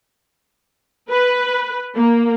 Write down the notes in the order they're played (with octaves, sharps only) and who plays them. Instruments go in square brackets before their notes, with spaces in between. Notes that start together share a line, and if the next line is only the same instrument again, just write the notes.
[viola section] B4
A#3